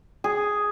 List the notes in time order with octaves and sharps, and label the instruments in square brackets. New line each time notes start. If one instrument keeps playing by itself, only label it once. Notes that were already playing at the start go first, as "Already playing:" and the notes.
[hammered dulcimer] G#4